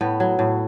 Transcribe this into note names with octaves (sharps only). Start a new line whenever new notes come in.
A2 B3
F#3
A2